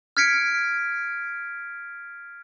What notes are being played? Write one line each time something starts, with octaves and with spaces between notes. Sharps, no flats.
F6 G#6 B6 C#7 D7